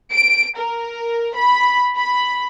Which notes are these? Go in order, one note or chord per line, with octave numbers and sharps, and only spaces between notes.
D7
A#4
B5
B5